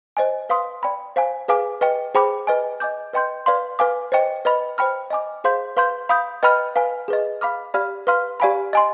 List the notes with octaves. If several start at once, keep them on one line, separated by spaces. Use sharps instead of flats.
C5 D#5 G#5
B4 F5 C6 D#6
D5 G5 B5
C5 F5 G#5
G#4 B4 F5 G#5 D6
B4 D#5 G5
G#4 C5 G5 B5 D6
B4 D#5 G#5
D#5 G#5 D6 G6
B4 D#5 G5 C6 G6
B4 D5 F5 C6
B4 F5 G#5 D6
C5 D#5 G5
B4 D#5 B5
C5 G5 B5 F6
D#5 G#5 D6
G#4 C5 F5 C6 G6
B4 F5 C6 G6
F5 B5 D#6 G6
B4 D#5 G5 B5 F6
B4 F5 G#5
G#4 B4 D#5
F5 B5 D6 F6
G4 D5 F5 B5 F6
B4 F5 C6 F6
G4 D5 F5 G#5 B5
D#5 G#5 C6